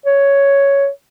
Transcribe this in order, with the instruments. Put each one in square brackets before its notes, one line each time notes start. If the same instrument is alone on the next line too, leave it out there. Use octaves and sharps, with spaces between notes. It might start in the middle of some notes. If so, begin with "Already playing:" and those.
[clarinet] C#5